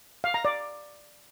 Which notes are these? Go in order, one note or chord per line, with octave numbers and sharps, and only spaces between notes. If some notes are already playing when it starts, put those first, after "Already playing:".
F5
A#5
D5